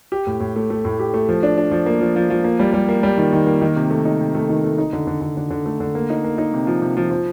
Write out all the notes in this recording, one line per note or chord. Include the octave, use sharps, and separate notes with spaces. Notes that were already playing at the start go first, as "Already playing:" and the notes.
G4
A2
A2
A3
A3
A2
G4
A3
F3
D4
D4
F3
A#3
F3
F3
F3
A#3
G3
G3
A#3
G3
D#3
D#3
A#3
D#3
C3
A3
D#4
C3
A3
D#3
A3
D#4
D3
D3
D3
D3
D3
A3
D3
A#3
D#4
A#3
D#4
C3
F3
C3
F3
F3